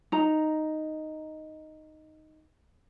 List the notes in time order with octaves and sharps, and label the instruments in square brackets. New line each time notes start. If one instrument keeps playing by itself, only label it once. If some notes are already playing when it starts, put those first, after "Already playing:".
[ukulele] D#4 A#5